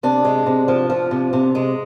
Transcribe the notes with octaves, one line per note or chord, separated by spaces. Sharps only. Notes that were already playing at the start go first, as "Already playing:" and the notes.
C3 D4
G#3
C3
F3
F3
C3
C3
G#3